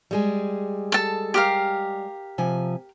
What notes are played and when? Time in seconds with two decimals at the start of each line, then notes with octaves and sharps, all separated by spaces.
0.11 G3 G#3 G#4
0.92 A4 A5
1.34 G4 A#4 F5
2.38 C3 F3 G#5